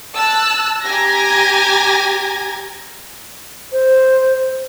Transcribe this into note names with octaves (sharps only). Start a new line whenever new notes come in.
A5 E6 F#6
G4 G#5 A#5 G#6 A#6
C5